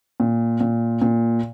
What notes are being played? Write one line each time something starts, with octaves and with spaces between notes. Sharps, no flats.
A#2
A#2
A#2